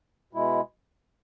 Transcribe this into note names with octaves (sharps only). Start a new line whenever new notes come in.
B2 G#3 E4